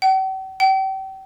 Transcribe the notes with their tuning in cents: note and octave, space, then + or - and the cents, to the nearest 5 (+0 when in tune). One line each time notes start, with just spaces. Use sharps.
G5 -45
G5 -35